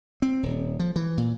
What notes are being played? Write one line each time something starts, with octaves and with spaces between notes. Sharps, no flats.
C4
D#1
F3
E3
A#2